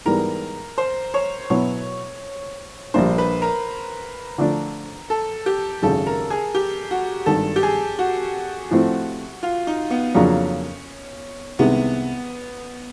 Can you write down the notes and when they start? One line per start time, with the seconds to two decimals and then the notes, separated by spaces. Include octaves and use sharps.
0.06 G#2 E3 G3 B3 A#4
0.78 C5
1.14 C#5
1.50 B2 F#3 B3 E4 C#5
2.94 A#1 A#2 G3 A#3 D4 C5
3.18 B4
3.42 A#4
4.38 D3 F3 A3 D4
5.10 A4
5.46 G4
5.82 G#1 F#2 C#3 A4
6.07 A#4
6.30 G#4
6.55 G4
6.91 F#4
7.26 G#1 G2 D#3 A4
7.56 G4
7.63 G#4
7.99 F#4
8.71 A2 F3 A3 C4
9.43 F4
9.67 D#4
9.91 B3
10.14 F2 C#3 F#3 A#3 C#4 D4
11.59 C2 C3 D#3 G#3 B3